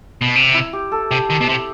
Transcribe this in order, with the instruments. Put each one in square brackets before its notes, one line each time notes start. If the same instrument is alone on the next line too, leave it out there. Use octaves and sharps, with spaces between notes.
[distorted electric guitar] B2
C3
[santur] E4
G4
A4
[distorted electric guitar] C3 [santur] G4
[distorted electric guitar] D#3
B2
C3